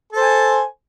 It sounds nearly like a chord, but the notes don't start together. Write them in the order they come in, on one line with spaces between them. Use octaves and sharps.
A4 C5 G#5